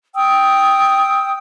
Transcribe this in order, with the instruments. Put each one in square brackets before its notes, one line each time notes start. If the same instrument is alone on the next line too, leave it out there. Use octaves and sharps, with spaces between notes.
[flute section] G5 D#6 E6